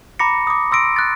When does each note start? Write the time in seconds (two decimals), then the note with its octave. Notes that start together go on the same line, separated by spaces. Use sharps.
0.19 A#5 B5 D6 A#6 C#7
0.47 D6 D#6
0.72 C6 E6 A#6 D7
0.96 F#6 A6